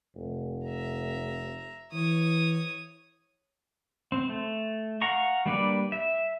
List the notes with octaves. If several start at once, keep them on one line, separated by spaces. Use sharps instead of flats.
F1
E5 A#5
E3 C#5 D#6
C4
A3
F5 F#5 A#5 C#6
G3 A#3 D4 B4 D5
E5